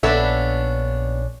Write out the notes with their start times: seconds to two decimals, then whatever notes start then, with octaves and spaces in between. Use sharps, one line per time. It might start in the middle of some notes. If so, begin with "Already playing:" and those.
0.03 A#1 B3 C#4 D4 A4 C#5 E5